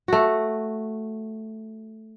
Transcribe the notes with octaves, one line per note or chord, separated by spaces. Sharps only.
A3 F#4